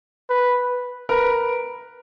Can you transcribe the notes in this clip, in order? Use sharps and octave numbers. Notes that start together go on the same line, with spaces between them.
B4
A#4 B4